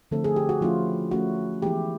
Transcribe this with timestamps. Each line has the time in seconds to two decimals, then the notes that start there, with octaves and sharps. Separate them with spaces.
0.11 D3 F3 A3 C4 A4
0.24 G#4
0.36 G4
0.49 F#4
0.61 F3 A3 C#4 E4 F4
1.11 F3 A3 C#4 E4 F#4
1.62 E3 G#3 B3 E4 G4